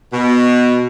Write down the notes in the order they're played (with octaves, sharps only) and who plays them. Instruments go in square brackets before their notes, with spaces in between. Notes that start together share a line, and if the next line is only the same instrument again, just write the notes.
[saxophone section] B2